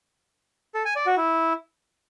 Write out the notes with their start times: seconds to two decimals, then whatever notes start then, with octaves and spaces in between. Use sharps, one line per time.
0.75 A4
0.85 G#5
0.96 D5
1.06 F#4
1.17 E4